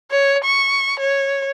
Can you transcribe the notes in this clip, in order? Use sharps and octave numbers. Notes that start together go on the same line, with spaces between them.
C#5
C#6
C#5